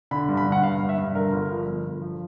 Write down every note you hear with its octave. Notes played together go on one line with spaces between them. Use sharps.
D3 B5
G2
B5
D3
F#5
G2 F5
G2
E5
G2
D3 A#4
G1
F3
G1
G1
F3